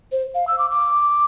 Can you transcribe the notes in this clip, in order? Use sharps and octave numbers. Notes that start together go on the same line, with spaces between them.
C5
F5
E6
D6
D6